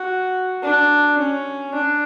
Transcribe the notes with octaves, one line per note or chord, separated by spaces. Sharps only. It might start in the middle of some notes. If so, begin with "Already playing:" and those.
Already playing: F#4
D4
C#4
D4